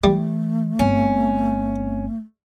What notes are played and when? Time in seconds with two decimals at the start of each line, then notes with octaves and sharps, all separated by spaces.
0.04 E3 G3 A3
0.79 G1 C4 C#4